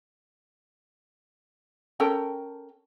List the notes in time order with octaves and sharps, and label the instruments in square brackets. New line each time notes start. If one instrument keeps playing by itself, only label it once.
[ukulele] C#4 A4 A#4 G5